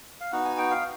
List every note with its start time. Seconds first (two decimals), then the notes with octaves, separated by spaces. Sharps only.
0.21 F5
0.32 B3 D#4 F#4 F#5
0.45 G#5
0.58 G5
0.71 F5